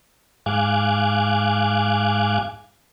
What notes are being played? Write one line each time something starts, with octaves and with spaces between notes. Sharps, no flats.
G#2 F5 G#5 D6 F#6